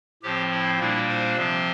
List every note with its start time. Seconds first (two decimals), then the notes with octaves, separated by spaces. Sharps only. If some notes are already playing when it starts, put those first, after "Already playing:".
0.23 A2 F3 C4 G4
0.51 E4
0.79 A#2 G3 A#3 D4 E4
1.08 C5
1.36 C3 F3 C4